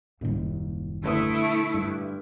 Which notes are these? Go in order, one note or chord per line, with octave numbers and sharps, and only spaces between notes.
F#1 D#2 A#2 G3
D3 A3 E4 B4 D#6
G2